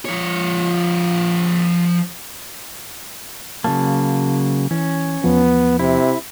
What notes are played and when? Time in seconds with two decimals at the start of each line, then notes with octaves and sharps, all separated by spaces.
0.05 F3 C#5
3.64 C#3 F#3 A#3 A5
4.71 E3 C#4
5.24 E2 F3 B3
5.79 C3 E4